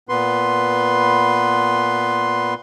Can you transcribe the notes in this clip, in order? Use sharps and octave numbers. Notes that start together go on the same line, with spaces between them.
A#2 B3 B4 C6